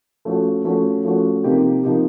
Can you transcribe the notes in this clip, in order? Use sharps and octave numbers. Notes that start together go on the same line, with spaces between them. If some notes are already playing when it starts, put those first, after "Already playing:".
F3 A3 C#4 F#4
F3 A3 C#4 F#4
F3 A3 C#4 F#4
C3 F3 A#3 D#4 G4
C3 F3 A#3 D#4 G4